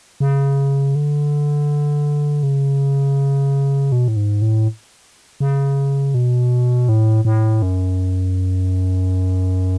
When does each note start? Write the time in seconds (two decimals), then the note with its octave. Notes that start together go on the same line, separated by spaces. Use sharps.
0.20 C#3
0.95 D3
2.43 C#3
3.92 B2
4.08 A2
4.16 G#2
4.42 A2
5.40 C#3
6.14 B2
6.89 A2
7.25 A2
7.62 F#2